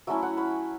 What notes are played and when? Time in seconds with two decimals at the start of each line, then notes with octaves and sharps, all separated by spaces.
0.07 F#3 A3 C#4 E4 E5
0.23 F#5
0.37 B5